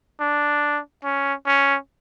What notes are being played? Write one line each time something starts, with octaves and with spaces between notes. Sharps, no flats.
D4
C#4
C#4